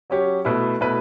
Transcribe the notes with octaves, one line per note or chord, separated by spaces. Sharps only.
F#3 C#4 G4 C#5
B2 A3 E4 B4
B2 A3 E4 B4